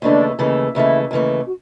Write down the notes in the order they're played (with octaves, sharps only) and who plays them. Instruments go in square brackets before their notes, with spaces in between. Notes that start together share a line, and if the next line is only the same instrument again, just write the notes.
[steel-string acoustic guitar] D#2 C#3 E3 A3 [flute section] D4 D5
[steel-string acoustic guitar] D#2 C#3 E3 A3
[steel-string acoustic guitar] D#2 C#3 E3 A3 [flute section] E4 E5
[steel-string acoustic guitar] D#2 C#3 E3 A3
[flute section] F#4